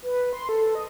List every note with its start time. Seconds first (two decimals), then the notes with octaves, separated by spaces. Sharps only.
0.02 B4
0.33 C6
0.49 A4
0.75 D#5